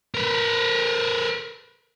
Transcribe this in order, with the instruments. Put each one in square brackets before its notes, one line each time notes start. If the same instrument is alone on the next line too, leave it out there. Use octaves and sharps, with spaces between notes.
[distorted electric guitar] A#4 B4